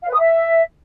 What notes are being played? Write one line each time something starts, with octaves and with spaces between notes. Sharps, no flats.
F5
B4
D#6
E5